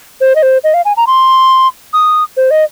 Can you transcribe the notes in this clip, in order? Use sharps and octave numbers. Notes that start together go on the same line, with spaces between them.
C5
D#5
C5
D#5
F5
G#5
A#5
C6
D#6
C5
D#5